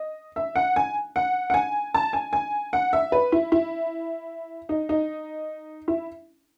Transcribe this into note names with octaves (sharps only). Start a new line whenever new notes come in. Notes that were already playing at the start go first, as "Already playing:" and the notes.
Already playing: D#5
E5
F#5
G#5
F#5
F#5
G#5
A5
G#5
G#5
F#5
E5
B4
E4
E4
D#4
D#4
E4